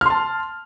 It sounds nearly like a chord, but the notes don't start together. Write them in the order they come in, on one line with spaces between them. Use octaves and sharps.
F6 C6 A5